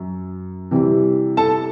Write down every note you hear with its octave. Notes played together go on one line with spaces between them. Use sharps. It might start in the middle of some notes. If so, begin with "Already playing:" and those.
Already playing: F#2
C3 E3 G3
A4 A5